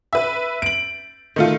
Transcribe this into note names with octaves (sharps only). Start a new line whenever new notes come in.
B4 E5
D7 F#7
D#3 A3 F4